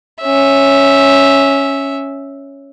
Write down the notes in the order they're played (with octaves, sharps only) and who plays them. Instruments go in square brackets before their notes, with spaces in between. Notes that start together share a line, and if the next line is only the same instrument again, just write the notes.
[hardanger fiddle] C#4 E5